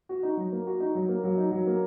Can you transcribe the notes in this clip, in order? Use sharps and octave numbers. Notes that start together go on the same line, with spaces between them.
F#4
D#4
F#3
A#3
F#4
D#4
F#3
A#3
F#3
D#4
F#3
A#3